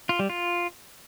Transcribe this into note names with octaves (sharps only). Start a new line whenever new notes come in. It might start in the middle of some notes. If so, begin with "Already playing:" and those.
F4
G3
F4